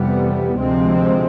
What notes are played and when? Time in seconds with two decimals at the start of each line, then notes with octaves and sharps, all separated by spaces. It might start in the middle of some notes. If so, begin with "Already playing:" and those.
Already playing: F2 C3 E3 G3 B3
0.58 D2 C3 F3 G#3 C4